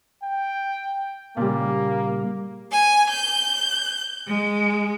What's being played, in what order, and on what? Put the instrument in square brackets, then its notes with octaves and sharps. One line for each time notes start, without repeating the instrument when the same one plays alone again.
[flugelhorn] G5
[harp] A#2 C#3 G3 [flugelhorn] A#3
[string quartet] G#5
G6
G#3